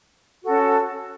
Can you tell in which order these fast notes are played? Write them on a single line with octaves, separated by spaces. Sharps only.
F#4 A4 C#4